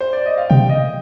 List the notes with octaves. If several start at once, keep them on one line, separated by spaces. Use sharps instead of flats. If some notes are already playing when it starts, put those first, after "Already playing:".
C5
D5
D#5
F5
C3 G5
D#5